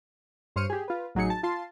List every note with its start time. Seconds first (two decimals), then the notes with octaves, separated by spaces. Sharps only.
0.56 G2 C5 C#5 F6 C#7 D#7
0.70 G4 G#4
0.88 F4 B4
1.15 A1 F#3 D#4 G#4 C#7
1.30 A5
1.43 F4 A5 C6